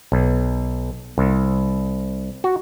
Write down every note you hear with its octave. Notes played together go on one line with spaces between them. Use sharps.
B1
C2
F#4